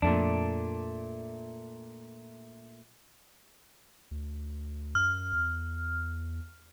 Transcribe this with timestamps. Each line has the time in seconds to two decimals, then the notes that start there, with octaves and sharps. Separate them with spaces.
0.02 F2 A#2 A3 D4
4.11 D2
4.95 F#2 F6
5.33 E2